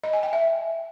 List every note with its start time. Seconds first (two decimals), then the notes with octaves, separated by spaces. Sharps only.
0.03 D#5
0.13 G#5
0.23 G5
0.33 E5